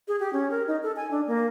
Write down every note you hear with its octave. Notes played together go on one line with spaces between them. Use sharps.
G#4
G4
C#4
A#4
D#4
A4
G#5
D4
A#3